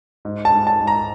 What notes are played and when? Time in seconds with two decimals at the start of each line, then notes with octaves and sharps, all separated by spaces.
0.25 G#2
0.45 A5
0.52 G#2
0.67 A5
0.81 G#2
0.87 A#5